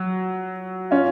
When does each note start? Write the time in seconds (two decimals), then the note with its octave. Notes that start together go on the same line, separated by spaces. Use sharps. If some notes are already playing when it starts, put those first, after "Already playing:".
Already playing: F#3
0.91 C#4 F4